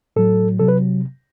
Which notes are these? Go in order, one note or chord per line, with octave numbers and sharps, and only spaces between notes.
A2 F#3 A4
C3 F#3 A4
B4